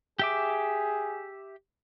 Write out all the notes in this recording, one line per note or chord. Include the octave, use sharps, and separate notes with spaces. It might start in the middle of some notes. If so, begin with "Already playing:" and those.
G4 G#4 E5 D6